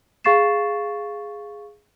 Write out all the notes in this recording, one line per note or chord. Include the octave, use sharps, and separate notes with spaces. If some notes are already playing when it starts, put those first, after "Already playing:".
G#4 F5 C#6 A6 C7 E7